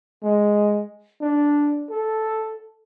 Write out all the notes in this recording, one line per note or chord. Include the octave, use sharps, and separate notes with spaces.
G#3
D4
A4